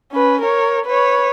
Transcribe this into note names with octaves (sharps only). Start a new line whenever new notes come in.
C#4 B4
A#4 C#5
B4 C#5